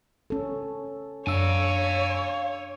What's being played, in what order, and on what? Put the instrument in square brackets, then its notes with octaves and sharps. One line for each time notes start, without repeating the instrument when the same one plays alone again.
[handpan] C#4 A4
[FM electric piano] F#2 E6 [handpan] D4 [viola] C#5 [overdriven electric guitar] F5 G#5